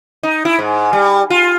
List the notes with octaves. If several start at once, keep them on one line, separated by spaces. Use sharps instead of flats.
D#4
E4
G#2
G3
F4